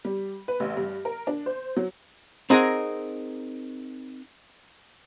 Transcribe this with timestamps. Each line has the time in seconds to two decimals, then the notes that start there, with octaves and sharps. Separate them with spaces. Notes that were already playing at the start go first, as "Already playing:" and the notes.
0.05 G3
0.48 B4
0.60 A1
0.77 G2
1.05 A#4
1.27 D4
1.46 C5
1.77 F#3
2.50 C4 D#4 G#4 A#4 F#5